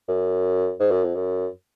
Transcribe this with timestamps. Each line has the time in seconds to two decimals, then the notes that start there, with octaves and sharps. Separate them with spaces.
0.08 F#2
0.80 G#2
0.91 F#2
1.04 F2
1.15 F#2